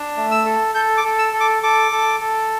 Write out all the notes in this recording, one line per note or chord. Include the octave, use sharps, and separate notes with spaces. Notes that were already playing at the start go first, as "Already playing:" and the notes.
Already playing: D4
A3
E6
A4
A4 G6
D6
A4
E6
A4
D6
A4 D6
A4
A4